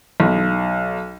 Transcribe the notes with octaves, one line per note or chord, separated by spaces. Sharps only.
B1